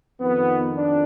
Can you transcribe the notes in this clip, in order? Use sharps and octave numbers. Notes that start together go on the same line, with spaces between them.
F2 D#3 B3
D4